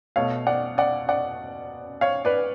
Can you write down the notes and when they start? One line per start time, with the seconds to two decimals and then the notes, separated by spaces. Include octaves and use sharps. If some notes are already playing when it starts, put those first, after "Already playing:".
0.16 B2 A3 C#5 F5
0.47 D5 F#5
0.78 D5 F#5
1.09 D5 F#5
2.01 C#5 F5
2.25 B4 D5